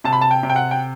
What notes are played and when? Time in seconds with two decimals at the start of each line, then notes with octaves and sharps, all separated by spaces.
0.04 C3 A5
0.13 B5
0.21 A5
0.31 G5
0.43 C3
0.50 G5
0.56 F#5
0.71 G5